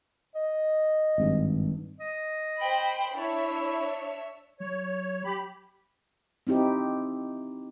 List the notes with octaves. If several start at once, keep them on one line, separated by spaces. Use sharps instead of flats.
D#5
G#1 G2
D#5
C5 G5 B5
D4 E4 C#5 E5
F#3 C#5
G4 B5
C4 D#4 E4 G4